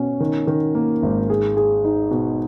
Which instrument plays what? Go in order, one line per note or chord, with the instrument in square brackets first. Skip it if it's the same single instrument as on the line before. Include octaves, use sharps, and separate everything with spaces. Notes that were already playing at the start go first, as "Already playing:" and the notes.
Already playing: [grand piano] B2 C#4
D#3
D#3
A#3
G#1
G#4
G#4
D#4
B2